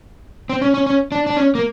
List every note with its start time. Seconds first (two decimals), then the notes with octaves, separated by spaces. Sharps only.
0.49 C4
0.62 C#4
0.74 C#4
0.86 C#4
1.12 D4
1.26 D4
1.37 C#4
1.55 A#3